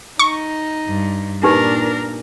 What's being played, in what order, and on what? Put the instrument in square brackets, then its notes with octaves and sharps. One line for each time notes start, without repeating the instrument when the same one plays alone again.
[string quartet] D#4 [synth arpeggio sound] C#6
[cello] G2
[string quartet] A#2 [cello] D4 A#4 [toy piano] D#4 G4 B4